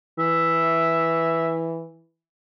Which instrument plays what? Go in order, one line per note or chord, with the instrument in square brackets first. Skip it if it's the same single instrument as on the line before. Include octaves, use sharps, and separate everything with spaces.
[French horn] E3 [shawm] E5